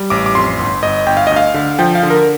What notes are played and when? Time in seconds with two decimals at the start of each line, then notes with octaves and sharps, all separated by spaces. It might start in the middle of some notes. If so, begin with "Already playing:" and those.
Already playing: G3
0.10 A1 D6
0.26 D6
0.35 F2 C6
0.59 G1
0.82 G1 D#5
1.06 G1 G5
1.17 F5
1.27 D2 D#5
1.36 F5
1.54 D3
1.79 F3 G5
1.95 F5
2.03 D3
2.10 A#4